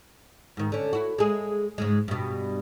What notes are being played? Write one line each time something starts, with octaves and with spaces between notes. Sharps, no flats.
G#2 D#3
D3 C#4
E4 F#4
G#3 G#4
G#2 C#3 G#3
G2 B2